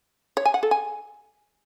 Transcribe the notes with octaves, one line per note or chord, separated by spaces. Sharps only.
C#5
G#5
F#5
A4
G#5